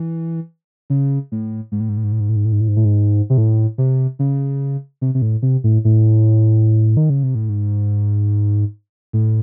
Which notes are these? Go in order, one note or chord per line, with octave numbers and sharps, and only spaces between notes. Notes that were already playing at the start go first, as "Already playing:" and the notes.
Already playing: E3
C#3
A2
G#2
A2
G#2
A2
G#2
A2
G#2
A2
G#2
A2
G#2
A2
G#2
A2
G#2
C3
A2
C3
C#3
C3
C3
A2
C3
A2
A2
D#3
C#3
C3
A2
G#2
A2